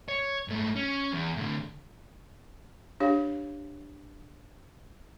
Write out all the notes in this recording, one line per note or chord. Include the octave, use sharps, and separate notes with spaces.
C#5
G#2 A3
C#4
E2
A2 D3
D4 G4 C#5 F5